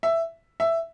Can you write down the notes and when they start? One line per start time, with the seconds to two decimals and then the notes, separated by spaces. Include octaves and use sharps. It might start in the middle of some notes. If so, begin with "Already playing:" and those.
0.03 E5
0.60 E5